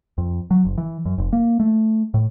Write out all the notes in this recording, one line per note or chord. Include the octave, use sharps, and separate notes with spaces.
F2
F#3
F#1
E3
F#2
F1
A#3
A3
A2